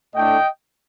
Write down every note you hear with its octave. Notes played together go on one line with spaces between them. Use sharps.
A2 A3 D4 D#5 G5